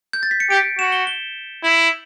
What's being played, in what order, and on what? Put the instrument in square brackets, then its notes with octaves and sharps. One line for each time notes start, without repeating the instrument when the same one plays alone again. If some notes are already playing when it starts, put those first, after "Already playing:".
[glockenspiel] G6
A6
B6
C#7
[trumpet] G4 [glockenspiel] D7
[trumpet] F#4 [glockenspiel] E7
[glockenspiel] G7
G7
[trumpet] E4 [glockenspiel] F#7